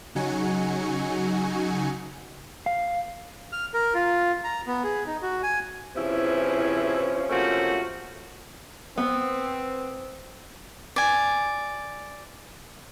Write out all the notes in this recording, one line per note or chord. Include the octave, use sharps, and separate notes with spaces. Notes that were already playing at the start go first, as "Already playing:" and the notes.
C#3 F#3 D#4 F#4 G#5 C#7
F5
F6
A#4
F4
A#5
B3
G#4
D#4
F#4
G#5
C3 E3 F3 C#4 E4 G#4
C3 F3 A3 A#3 C#4 F#4
B3 C4
D5 G#5